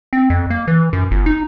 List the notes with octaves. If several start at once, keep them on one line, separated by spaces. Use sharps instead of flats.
C4
F2
A#3
E3
F#2
G1
D#4